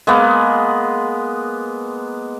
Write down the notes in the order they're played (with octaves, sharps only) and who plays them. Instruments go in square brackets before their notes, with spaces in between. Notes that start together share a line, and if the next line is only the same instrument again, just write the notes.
[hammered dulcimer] G#3 A#3 B3